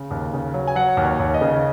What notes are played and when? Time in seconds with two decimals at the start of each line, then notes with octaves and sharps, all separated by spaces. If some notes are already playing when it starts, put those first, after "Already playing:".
Already playing: C#3
0.11 D#2
0.33 C#3
0.54 F#3
0.68 G#5
0.76 F#3 F#5
0.97 D#2
1.05 C#5
1.19 D#2
1.34 D#5
1.41 C#3